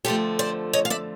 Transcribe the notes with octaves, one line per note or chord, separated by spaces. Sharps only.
F2 D3 F3 A3 G4 A4
C5 D5
C#5 D#5
F5
D5 E5